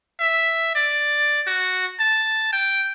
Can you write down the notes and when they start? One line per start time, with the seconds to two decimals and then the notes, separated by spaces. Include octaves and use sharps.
0.20 E5
0.75 D5
1.47 F#4
2.00 A5
2.53 G5